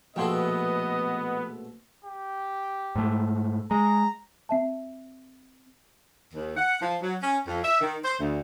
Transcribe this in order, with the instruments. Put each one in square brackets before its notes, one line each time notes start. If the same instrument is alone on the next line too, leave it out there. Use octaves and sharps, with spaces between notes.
[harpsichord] A#1 B2 A3 [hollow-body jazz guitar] F3 G5 C6 [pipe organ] B3 [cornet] D#5
[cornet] G4
[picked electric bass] G#2 A3
[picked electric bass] G#3 [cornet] A#5
[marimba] C4 E5 A5
[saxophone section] D#2
F#5
F3
F#3
C#4
F2
E5
D#3
C5
D2